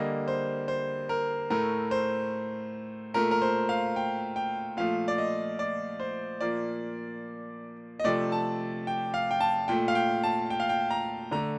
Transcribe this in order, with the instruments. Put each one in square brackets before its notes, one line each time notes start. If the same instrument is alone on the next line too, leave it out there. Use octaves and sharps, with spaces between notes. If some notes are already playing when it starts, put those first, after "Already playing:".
Already playing: [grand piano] D3 G3 A#3 D#5
C5
C5
A#4
A2 A3 A#4
C5
A#2 A3 A#4
A#4
C5
F5
G5
G5
A#2 F3 A3 F5
D5
D#5
D5
C5
A#2 F3 A#3 D5
D#5
C3 F3 A3 D5
A5
G5
F5
G5
A5
A#2 A3 G5
F5
G5
A5
G5
F5
G5
A#5
D3 A3 A#5